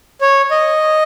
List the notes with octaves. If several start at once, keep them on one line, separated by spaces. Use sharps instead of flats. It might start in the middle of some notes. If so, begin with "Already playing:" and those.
C#5
D#5